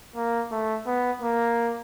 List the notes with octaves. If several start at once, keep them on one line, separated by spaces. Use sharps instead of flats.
A#3
A3
B3
A#3